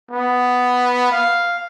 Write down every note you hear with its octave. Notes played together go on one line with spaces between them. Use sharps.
B3
F5